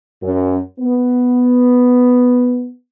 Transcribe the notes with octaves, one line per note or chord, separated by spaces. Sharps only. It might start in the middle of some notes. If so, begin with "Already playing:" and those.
F#2
B3